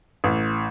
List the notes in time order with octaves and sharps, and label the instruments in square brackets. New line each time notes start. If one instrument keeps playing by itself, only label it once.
[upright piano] A1